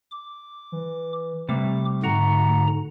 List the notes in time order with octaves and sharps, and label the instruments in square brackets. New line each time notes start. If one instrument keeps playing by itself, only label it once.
[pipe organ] D6
[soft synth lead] E3
[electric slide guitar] C3 G3 [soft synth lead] A3 [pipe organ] D6
[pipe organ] G#2 D3 A#5 [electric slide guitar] F#4